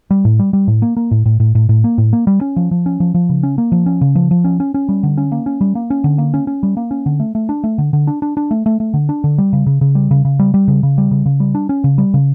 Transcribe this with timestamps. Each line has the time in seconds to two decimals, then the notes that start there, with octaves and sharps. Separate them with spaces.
0.11 G3
0.25 A2
0.39 G3
0.53 G3
0.68 A2
0.82 A#3
0.97 A#3
1.11 A2
1.26 A2
1.40 A2
1.55 A2
1.69 A2
1.84 A#3
1.98 A2
2.13 A#3
2.27 G3
2.41 C#4
2.56 F3
2.71 F3
2.86 C#4
3.00 F3
3.15 F3
3.29 C#3
3.43 C#4
3.58 A#3
3.72 F3
3.86 C#4
4.01 C#3
4.15 F3
4.31 F3
4.45 C#4
4.60 C#4
4.74 C#4
4.89 G3
5.03 D3
5.18 C#4
5.32 A#3
5.46 C#4
5.61 G3
5.75 A#3
5.90 C#4
6.04 D3
6.18 A#3
6.34 C#4
6.47 C#4
6.63 G3
6.77 A#3
6.91 C#4
7.06 D3
7.20 A3
7.35 A3
7.49 D4
7.64 A3
7.78 D3
7.93 D3
8.07 D4
8.22 D4
8.37 D4
8.51 A3
8.66 A3
8.80 A3
8.94 D3
9.09 D4
9.24 D3
9.38 G3
9.53 C#3
9.67 C#3
9.81 C#3
9.95 G3
10.11 C#3
10.25 C#3
10.39 G3
10.54 G3
10.68 C#3
10.83 C#3
10.98 G3
11.11 C#3
11.26 C#3
11.40 G3
11.55 D4
11.69 C#4
11.84 C#3
11.98 G3
12.14 C#3